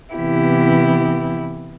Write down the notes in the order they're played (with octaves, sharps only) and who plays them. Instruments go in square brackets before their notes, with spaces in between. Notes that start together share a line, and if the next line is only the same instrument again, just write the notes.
[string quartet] C3 E3 B3 E4 G4